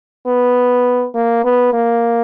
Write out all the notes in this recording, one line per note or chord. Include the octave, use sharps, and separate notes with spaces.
B3
A#3
B3
A#3